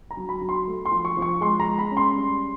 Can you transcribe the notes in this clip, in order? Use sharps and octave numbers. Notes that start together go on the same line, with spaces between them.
A#5
F#3
B5
F#3
C6
A3
C6
F3
C#6
F3
C#6
G#3 C6
A#5
G#3
B5
C#4
C6
G3